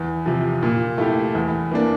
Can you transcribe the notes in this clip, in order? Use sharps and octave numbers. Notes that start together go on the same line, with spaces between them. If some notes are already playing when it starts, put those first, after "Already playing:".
Already playing: E2
C3 F3
A#2
A3 E4 G4
E2
E3 A#3 D4